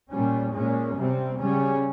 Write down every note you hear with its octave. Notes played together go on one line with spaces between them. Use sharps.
A#2 G3 C#4
A#2 G#3 C#4
C3 G3 C4
C#3 G3 C#4